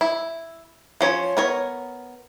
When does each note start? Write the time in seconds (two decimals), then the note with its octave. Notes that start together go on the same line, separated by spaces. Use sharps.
0.01 E4
1.01 F3 C#4 C#5
1.37 B3 A#4 C#5